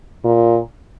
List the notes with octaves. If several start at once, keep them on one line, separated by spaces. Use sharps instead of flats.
A#2